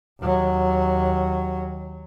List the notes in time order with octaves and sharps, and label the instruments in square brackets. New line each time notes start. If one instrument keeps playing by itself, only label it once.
[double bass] D#2 F#3